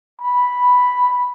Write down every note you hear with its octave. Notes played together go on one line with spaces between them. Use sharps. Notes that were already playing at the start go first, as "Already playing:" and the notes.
B5